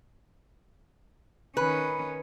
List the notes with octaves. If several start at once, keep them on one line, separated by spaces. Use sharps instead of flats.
D#3 C#4 B4